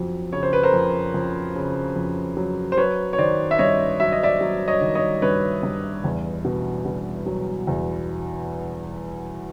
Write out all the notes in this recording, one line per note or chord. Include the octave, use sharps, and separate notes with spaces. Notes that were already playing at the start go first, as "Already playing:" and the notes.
Already playing: F2 F#3
C#3 C#5
C5
B4
A#4 C5
F2
F2
C#3
F2
F#3
C5
F#3 B4 C#5
C#5
D#3 C5 D5
E5
G2 C#5 D#5
F#3 E5
D#5
D5 E5
F#3
C#5 D#5
D#3
C#5 D#5
G2 B4 C#5
G2
E2
B2
B2
F#3
E2